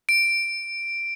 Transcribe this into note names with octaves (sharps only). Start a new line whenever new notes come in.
D7